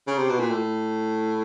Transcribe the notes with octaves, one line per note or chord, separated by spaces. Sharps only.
C#3
C3
B2
A#2
A2